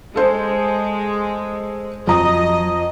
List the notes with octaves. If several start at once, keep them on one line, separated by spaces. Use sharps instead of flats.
G#3 A4 C5
F2 F3 F#3 D#5 A#5 D#6